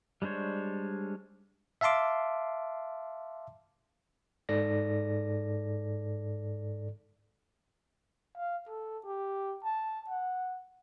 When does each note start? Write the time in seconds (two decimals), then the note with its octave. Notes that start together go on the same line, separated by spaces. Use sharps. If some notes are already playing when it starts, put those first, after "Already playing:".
0.22 G3 G#3 D4 C5 C#5
1.81 E5 F5 A5 C6 D6
4.49 G#2 A4 D5 A#6
8.37 F5
8.68 A4
9.05 G4
9.64 A5
10.09 F#5